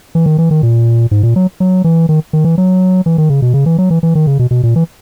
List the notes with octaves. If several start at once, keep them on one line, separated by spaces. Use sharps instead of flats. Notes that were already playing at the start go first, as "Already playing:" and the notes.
E3
D#3
E3
D#3
A#2
G#2
A#2
F#3
F#3
E3
D#3
D#3
E3
F#3
E3
D#3
C#3
B2
C#3
E3
F#3
E3
E3
D#3
C#3
B2
B2
A#2
E3